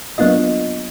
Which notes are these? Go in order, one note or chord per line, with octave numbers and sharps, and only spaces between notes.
F#3 A#3 B3 D4 F4 D#5